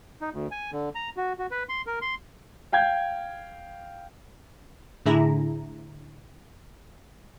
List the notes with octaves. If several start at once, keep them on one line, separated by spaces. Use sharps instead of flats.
D#4
D2
G#5
D3
A#5
F#4
F#4
B4
C6
A#4
C6
F5 G5 G6 G#6
A2 D3 E4 G#4 A#5